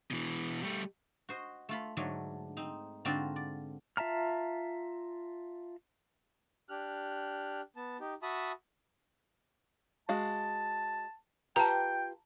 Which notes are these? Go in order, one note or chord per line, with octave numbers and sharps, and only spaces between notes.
B2 E3
G3 A3
F#4 C5 D#5
A3 F4 B5
G#2 D3 F#3 A3 D4
C4 D#4
G#2 D3 C4 F4 F#4 D5
D5
F4 E5 A5 A#5 F6
D4 G4 F6 F#6
B3 A5
D#4 G4
F#4 E5 A5 B5 D#6
G#3 F#4 F5 A5
F4 G4 B4 G5 A5 A#5